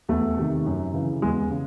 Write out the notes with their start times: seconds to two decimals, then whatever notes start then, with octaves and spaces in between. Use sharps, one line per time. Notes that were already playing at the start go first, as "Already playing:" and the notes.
0.09 E2 A3
0.37 C3 D#3
0.66 F#2
0.94 C#3 E3
1.22 E2 G#3
1.51 C#3